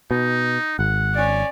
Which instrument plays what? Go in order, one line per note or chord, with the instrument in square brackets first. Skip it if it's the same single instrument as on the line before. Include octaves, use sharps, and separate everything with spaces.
[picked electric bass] B2 [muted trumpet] D#4
[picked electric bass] G#1 [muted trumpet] F#5
[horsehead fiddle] C#4 D5